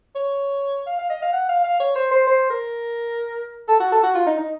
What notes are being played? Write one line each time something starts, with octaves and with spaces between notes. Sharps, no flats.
C#5
F5
F5
D#5
F5
F#5
F5
F5
C#5
C5
C5
C5
A#4
A4
F#4
A4
F#4
F4
D#4
D#4